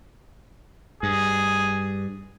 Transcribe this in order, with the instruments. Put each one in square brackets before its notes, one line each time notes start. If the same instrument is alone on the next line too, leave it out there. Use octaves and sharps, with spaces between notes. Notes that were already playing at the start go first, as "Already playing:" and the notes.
[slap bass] G2 [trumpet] G#4